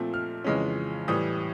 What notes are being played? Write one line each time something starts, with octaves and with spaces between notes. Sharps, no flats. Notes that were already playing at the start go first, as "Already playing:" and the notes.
Already playing: A#2 F3 A3 C4
F6
F2 C#3 E3 G#3 C#4
A2 E3 G3 D#6